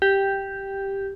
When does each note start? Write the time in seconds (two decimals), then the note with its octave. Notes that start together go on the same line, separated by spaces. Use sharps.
0.02 G4